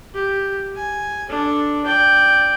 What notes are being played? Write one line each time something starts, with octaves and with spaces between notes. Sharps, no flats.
G4
G#5
D4 A4
D5 G5